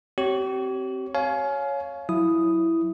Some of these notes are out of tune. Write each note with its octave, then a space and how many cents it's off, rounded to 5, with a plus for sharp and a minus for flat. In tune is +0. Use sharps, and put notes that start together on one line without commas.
C4 +5 G4 -40 C#5 +0
C#5 +5 F5 +0 G#5 +30
F#3 -15 E4 +0 D#6 +0